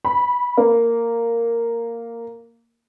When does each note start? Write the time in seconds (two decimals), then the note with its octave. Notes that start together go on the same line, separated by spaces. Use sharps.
0.05 B5
0.57 A#3